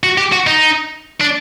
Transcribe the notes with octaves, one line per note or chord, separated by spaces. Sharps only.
F#4
G4
F#4
D#4
D4